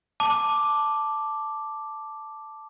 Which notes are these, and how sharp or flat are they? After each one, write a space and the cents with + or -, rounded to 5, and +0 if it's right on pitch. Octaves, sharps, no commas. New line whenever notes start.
A5 +0 D6 +0